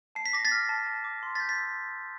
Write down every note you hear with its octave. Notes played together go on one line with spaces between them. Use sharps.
A5 C7
B6
D6 A#6
A6 B6
F6
A5
A5
D6
C6
A6 B6
G6
A6 B6
E6